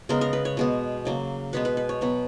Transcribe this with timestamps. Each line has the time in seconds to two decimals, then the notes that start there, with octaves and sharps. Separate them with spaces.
0.09 C#3 G#3 B3 A#4
0.21 A#4
0.33 B4
0.45 C#5
0.57 B2 G#3 B3
1.05 C#3 F#3 A#3
1.53 B2 G#3 B3 B4
1.65 B4
1.77 B4
1.89 C#5
2.01 B2 F#3 B3 B4